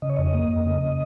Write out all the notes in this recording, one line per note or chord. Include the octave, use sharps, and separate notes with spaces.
C#3 D#5
C#5
F2 D#5
A#3
F2
C#3